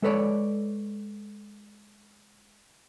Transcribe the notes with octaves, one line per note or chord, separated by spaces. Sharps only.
G#3 A4 B4 C#5 D5